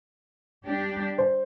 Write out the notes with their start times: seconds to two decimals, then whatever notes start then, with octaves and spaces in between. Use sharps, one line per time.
0.65 G3 D4 G4
1.18 C5